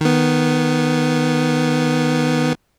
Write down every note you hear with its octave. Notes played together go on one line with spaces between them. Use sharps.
D#3 B3